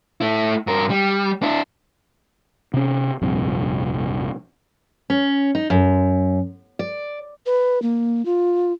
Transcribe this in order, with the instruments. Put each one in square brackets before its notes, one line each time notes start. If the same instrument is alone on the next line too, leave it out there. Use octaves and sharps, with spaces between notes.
[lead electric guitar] A3 E4
G2 A#4
G3
D4 E4
[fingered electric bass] C3 C#4
F1 A#1 G2 C3
[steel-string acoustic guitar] C#4
D#4
F#2
D5
[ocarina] B4
A#3
F4